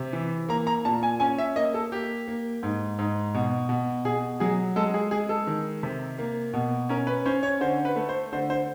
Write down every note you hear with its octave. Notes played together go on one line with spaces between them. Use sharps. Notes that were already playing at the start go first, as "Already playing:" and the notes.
Already playing: C3
E3
A#3 A#5
A#5
A#2 A5
G#5
C#4 G#5
E5
A#3 D#5
A4
A#3 G4
A#3
G#2
G#2
B2
B2
B2 G#4
F#3 G#4
G#3 A4
G#4
G#3 G#4
A4
D#3
C3
A#3
B2
C#4 A#4
B4
C#4 C5
C#5
D3 C5
B4
A3
C5
D3 C5
C5